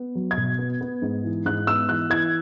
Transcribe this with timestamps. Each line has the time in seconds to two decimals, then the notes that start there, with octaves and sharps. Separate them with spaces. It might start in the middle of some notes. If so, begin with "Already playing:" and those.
Already playing: B3
0.15 F#3
0.31 G#6
0.38 B2
0.59 B3
0.81 B3
1.02 G#2
1.24 E3
1.46 G#2 F#6
1.67 B3 E6
1.89 E3 F#6
2.10 E3 G#6